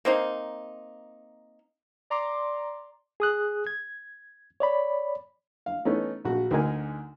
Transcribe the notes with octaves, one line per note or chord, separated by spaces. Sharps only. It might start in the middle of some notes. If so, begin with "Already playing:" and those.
A#3 C4 D#4
D5 A#5 C6 D6
G#4 D#6 F#6
G#6
C#5 D5 B5
F5
E3 A3 B3 C#4 D#4
A#1 F#4
D2 D3 D#4 A#4 G#5